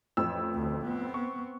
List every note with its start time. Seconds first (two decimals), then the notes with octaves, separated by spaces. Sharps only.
0.17 A1 F2 E6
0.55 D2
0.86 B3 C4
1.14 C#6